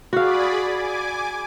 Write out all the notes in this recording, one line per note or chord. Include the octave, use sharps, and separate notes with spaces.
F#4 G#4 D5 F5 B5
G#5 D6